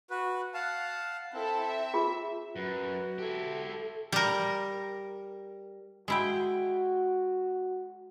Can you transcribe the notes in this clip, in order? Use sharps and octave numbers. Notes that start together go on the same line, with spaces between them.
F#4 B4
F5 F#5 A5
C4 E4 A4 A5
E5
F4 G#4
F#2 F#4 B4
E4 G4 A4
G3 A#4
G#3 E4 F#4 G5